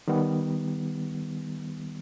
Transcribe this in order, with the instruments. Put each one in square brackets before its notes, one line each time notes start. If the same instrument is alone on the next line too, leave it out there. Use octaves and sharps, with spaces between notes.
[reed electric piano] D#3 G3 B3